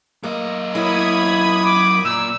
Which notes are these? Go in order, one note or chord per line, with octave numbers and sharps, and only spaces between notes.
F#2 A#3 D#5
F#3 A#3 E4 B5 D#6 G#6
D6
A#2 E6